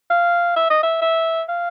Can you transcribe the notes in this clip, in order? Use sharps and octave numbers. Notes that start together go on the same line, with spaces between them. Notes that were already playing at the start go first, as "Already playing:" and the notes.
F5
E5
D#5
E5
E5
F5